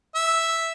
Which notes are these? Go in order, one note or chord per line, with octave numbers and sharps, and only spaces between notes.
E5